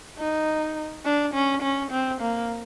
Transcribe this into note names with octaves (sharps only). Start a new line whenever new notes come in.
D#4
D4
C#4
C#4
C4
A#3